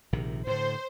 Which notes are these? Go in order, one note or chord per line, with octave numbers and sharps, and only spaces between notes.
A#1 C3 D#3
A2 D3 C5